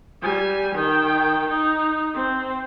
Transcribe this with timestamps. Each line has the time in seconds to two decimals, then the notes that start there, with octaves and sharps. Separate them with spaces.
0.22 G3 G#5
0.75 D#3 G5
1.50 D#4
2.14 C4